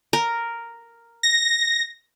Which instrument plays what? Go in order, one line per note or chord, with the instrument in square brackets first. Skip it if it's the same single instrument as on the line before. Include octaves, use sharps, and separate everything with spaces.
[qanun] A#4
[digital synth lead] A#6